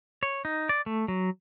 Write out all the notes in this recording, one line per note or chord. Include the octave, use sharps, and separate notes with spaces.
C#5
D#4
D5
A3
F#3